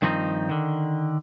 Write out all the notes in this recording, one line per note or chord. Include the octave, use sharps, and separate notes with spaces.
G2 D#3 F3 C4 C#4 D#4
D3 D#3